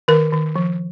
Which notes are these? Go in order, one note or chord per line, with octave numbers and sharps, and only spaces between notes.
D#3 A#4
D#3
F3